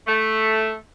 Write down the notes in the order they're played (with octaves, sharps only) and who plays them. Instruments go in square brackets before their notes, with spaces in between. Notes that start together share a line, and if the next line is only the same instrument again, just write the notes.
[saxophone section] A3